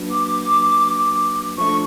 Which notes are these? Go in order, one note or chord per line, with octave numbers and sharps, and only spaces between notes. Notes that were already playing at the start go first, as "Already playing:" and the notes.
Already playing: F#3 A#3 D4 F#4 B4
D6
F3 A3 D4 C#6